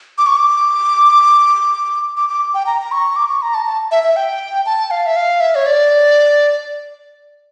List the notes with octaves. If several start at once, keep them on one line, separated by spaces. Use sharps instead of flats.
D6
C#6
D6
D6
D6
G5
A#5
A#5
C#6
D6
C#6
A#5
A5
A5
E5
E5
G5
A5
F5
E5
F5
E5
C#5
D5